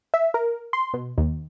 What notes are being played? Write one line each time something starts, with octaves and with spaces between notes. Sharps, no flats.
E5
A#4
C6
B2
D#2